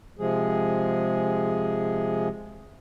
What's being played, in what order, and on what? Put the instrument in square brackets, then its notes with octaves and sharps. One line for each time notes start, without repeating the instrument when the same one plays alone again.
[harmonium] C3 F3 G#3 G#4